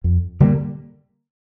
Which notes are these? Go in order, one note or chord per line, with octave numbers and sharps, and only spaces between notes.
F2
D3 G3 A#3